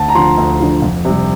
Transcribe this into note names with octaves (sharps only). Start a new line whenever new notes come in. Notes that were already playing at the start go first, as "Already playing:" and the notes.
Already playing: D2 A5
A#5
D3 F3 C6
D2
D3 F3
F2
C3 G3